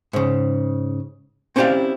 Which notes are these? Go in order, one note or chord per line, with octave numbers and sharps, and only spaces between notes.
G#2 C#3
C4 C#4 E4 G4 D5 F5